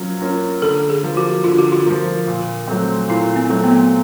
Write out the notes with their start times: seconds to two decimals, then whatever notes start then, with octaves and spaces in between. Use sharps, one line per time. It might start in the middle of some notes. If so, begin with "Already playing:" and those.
Already playing: F#3 A#3 C#4 F4
0.22 A#3 C#4 F4
0.62 D3 A4
0.90 G#4
1.03 F3 A#3
1.17 F#4
1.44 D3 F4
1.58 F#4
1.72 F4
1.86 F3 A#3
2.27 A#2
2.68 F#3 A3 C4
3.09 A#2 E4
3.36 C4
3.50 F#3 A3 C4
3.64 B3